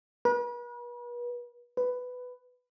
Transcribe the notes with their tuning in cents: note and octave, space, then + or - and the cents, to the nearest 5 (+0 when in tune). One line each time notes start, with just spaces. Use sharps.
B4 -40
B4 +10